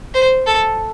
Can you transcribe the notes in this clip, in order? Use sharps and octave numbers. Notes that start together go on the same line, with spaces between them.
C5
A4